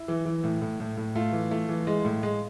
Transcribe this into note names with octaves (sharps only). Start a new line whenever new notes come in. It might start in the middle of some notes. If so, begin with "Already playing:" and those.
Already playing: E4
E3
E3
A2
A2
A2
A2
A3 F4
E3
A3
E3
G#3
A2
G#3